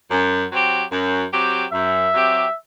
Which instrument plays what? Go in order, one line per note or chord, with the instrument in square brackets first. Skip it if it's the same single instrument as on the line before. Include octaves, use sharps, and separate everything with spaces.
[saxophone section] F#2
F#3 C4 G4
F#2
F#3 C4 G4
[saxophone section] F#2 [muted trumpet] E5
[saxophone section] F#3 C4 G4